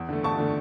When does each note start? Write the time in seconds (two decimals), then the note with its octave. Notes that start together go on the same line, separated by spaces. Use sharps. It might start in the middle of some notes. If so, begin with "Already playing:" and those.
Already playing: E2
0.09 D3 A3
0.23 E2 A5 C#6
0.39 D3 A3